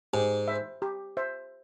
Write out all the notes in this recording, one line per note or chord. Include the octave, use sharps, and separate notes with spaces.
G#2 G4
C5 E5
G4
C5 E5